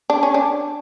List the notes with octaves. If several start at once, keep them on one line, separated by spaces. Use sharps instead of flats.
D4
C#4
D4